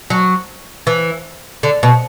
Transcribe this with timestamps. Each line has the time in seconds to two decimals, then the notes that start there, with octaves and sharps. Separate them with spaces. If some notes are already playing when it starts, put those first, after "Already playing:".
0.10 F#3
0.87 E3
1.63 D3
1.83 B2